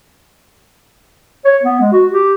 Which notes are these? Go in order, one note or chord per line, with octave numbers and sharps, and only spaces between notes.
C#5
B3
G#3
F#4
G4